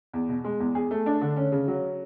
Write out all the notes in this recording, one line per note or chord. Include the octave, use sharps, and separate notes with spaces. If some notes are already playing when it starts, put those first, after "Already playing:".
E2
B2
G#3
E2
G#4
A3
D4
D3
C#4
C#3
F#3